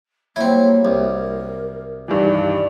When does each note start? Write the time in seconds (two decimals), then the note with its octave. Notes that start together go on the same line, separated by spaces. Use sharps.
0.36 F#3 G3 A#3 C4 E4
0.85 C2 A#4
2.08 G2 D#3 E3 D5